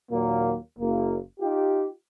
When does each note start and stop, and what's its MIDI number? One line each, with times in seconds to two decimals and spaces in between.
0.12 0.55 39
0.12 0.55 46
0.12 0.55 54
0.12 0.55 58
0.79 1.16 30
0.79 1.16 58
1.40 1.85 63
1.40 1.85 65
1.40 1.85 67